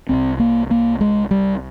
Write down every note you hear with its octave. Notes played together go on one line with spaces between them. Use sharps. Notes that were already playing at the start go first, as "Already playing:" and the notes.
C2 C3 C4
A#3
A#3
G#3
G3